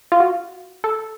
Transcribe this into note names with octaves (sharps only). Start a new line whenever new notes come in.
F4
F#4
A4